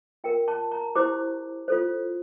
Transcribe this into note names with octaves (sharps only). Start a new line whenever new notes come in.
F4 A#4 G5
A5
A#5
E4 G4 C5 D6
F4 A4 C5